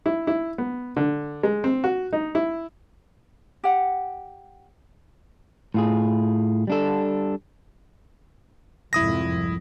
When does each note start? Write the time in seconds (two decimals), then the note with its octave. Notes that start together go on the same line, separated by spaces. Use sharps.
0.06 E4
0.27 E4
0.58 B3
0.97 D3
1.43 G#3
1.64 C4
1.84 F#4
2.13 D#4
2.35 E4
3.64 G4 F#5
5.74 A2 F4 G#4
6.67 G3 D4 A4
8.93 C2 F2 G#2 E4 D#6 A#6